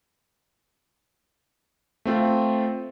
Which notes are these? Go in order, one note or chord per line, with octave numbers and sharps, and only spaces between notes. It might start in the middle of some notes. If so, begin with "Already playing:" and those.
A3 C4 F4